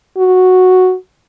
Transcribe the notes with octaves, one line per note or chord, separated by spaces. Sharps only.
F#4